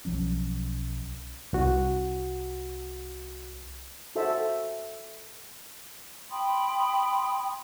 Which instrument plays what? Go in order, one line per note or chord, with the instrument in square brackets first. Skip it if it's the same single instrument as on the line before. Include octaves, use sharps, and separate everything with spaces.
[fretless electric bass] B1 F3 F#3 C#4
[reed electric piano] C2 F#4
[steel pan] F#4 A4 C5 E5
[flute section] G5 B5 C6 D#6